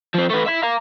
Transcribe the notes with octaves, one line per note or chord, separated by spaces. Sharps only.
F3 C4
A3 B4
E5 B5
F5 A#5